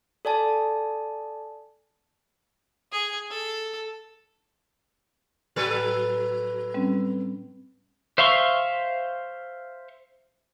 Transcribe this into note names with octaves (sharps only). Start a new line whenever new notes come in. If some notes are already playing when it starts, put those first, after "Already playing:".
A4 D5 G#5 A5
G#4
A4
A2 F#3 A4 B4
G3 C4 C#4
C5 E5 F5 C6 C#6